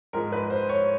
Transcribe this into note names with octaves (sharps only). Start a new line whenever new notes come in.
G#2 F3 G#3 A#4
B4
C5
C#5